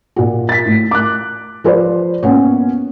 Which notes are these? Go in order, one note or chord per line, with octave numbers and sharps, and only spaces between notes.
A#2 F#4
A6 B6
A2
D6 F#6
F3 F4 B4 C5 D5
A#3 B3 C#4 C#5